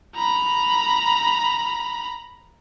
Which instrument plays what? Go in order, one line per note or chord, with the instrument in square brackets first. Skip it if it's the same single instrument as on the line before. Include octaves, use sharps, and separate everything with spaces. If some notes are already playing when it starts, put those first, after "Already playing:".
[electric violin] A#5 B5